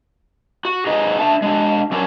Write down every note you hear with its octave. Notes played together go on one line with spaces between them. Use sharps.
F#4
D#4 G#4 B4 D#5
D4 E5 A5
G#3 D4
F#3 C#4 D4 A#4 C#5